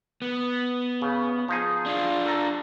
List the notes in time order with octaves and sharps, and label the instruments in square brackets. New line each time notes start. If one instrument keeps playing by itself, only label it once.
[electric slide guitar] B3
[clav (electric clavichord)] C#3
F3 D#4 G#4
[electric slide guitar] D4 F4 F5
[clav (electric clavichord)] A4 A#5